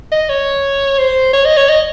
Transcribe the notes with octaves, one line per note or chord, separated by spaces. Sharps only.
D#5
C#5
C5
C#5
D#5
C#5
D#5